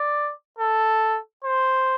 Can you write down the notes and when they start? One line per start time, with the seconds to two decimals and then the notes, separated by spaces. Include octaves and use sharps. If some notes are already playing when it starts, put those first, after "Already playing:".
Already playing: D5
0.58 A4
1.44 C5